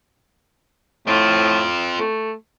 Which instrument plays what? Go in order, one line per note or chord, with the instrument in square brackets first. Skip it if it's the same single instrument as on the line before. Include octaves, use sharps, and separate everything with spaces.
[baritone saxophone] A2 [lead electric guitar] C4 F4
[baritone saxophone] A3